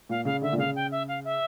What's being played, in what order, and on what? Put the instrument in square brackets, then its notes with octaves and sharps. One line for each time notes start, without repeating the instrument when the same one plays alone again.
[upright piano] A#2 [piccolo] F5
[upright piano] C#3 [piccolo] F5
[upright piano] D3 [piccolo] E5
[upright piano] A#2
[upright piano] C#3 [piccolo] F5
[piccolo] G5
E5
F5
E5